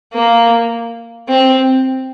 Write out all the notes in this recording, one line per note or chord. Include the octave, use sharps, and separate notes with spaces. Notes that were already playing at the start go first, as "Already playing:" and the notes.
A#3
C4